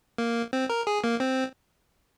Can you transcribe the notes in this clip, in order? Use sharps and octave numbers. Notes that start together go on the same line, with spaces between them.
A#3
C4
A#4
G#4
A#3
C4